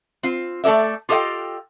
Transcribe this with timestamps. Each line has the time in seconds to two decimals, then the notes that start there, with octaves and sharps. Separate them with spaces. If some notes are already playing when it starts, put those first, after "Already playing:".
0.23 C4 F4
0.64 A3 A4 A#4 D5 E5
1.09 F4 G4 A4 D#5 F5 G5